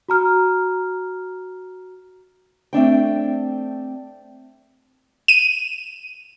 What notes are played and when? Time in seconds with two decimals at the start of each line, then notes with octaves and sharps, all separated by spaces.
0.09 F#4 A#5 F6
2.73 A3 C4 D4 G5
5.28 D#7